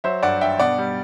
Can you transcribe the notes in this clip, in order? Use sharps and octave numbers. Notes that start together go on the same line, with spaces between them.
F#3 C5 E5
G2 D5 F#5
G2 E5 G5
B2 D5 F#5
G3